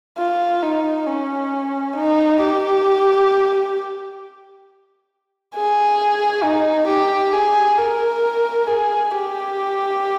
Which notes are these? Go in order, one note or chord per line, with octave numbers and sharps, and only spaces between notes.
F4
D#4
C#4
D#4
G4
G#4
D#4
G4
G#4
A#4
G#4
G4